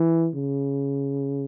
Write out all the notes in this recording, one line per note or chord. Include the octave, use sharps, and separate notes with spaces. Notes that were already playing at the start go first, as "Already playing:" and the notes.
Already playing: E3
C#3